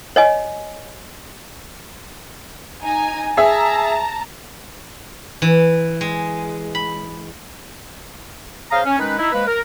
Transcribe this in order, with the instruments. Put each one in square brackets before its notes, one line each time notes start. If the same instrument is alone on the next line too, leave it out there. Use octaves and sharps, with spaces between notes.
[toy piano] C#5 D#5 G#5
[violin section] D#4 G#5 A#5
[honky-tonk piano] G#4 E5 [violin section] A5 A#5
[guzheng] E3
G#3
B5
[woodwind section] C#3 C5 F5 A#5 D#6 F6
C#4
D#3 G#3 C#4 D#4 B4
D#4 E4
F3 G#3 A#3 B4
A#4